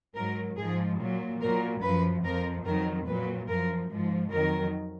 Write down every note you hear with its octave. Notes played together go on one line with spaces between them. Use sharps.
G#2 F#3 A#4
G#2 F3 G#4
A#2 F#3
A#2 F#3 A#4
F#2 F3 B4
F2 F3 A#4
F2 D#3 F#3 A#4
A#2 F#3 B4
F#2 F3 A#4
G#2 F3
F2 D#3 F#3 A#4